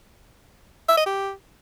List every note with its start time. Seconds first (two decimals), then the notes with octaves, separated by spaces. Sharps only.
0.89 E5
0.97 D#5
1.06 G4